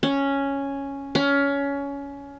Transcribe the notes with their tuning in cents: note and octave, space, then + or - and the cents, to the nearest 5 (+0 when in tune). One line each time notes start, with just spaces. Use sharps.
C#4 +0
C#4 +20